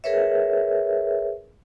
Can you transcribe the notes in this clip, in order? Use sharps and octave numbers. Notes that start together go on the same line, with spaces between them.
G#4 A#4 B4 C#5 E5